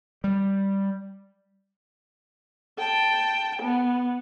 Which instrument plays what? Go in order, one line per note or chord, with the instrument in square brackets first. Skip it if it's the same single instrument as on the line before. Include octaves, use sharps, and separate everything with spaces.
[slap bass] G3
[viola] G5 A5
B3